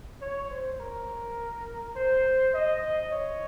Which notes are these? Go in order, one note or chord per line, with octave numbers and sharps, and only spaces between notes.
C#5
C5
A#4
C5
D#5
C#5